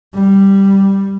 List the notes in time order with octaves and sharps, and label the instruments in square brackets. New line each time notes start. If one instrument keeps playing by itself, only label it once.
[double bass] G3